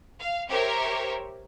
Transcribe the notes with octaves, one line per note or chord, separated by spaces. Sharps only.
F5
G4 A#4 C5 C#5 E5